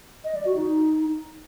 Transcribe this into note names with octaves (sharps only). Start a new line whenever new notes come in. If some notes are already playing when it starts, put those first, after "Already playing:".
D#5
D5
F#4
D#4